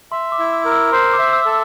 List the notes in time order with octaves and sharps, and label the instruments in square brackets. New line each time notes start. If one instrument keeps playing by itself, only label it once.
[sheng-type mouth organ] E5 [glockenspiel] C6
[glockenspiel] D6
[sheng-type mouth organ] E4
[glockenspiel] E6
[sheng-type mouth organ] A#4
[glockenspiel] E6
[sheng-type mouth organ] C5 [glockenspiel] C6
[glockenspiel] D6
[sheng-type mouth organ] E5
[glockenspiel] E6
[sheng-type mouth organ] A4